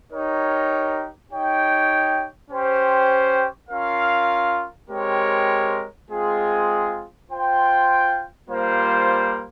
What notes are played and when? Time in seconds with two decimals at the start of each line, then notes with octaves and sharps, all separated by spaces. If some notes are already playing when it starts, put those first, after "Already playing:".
0.11 D#4 G4 A#4 C#5
1.31 D#4 G4 C#5 G5
2.50 C#4 G4 C5 G5
3.70 C#4 F4 A#4 F5
4.89 G#3 C4 G4 A#4 C#5
6.10 G#3 C4 F4 G#4
7.30 F4 C5 G5
8.49 G3 A#3 F4 C5